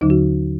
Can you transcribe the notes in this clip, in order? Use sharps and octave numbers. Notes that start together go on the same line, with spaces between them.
D#2 D3 F#3 D#4
F#4